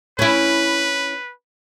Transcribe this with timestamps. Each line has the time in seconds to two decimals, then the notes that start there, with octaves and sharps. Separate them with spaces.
0.19 C#4 E4 B4